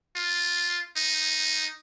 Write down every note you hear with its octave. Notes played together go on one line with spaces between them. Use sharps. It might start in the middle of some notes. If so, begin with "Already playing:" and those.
F4
D#4